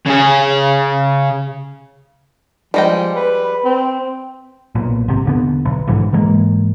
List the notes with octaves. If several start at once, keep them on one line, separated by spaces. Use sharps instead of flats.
C#3 G#4
F3 G3 G#3 G5
B4
C4
B1 A#2
G#1 C3
E1 D3 B3
B1
G1 G#2 D3 E3
G#2 E3 G#3 A#3